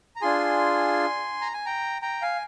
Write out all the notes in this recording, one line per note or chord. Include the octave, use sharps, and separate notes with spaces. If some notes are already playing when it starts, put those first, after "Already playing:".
A#5
D4 F4 G#4 G#5 C6
A#5
G#5
G5 A#5
G5 A#5
F5 G#5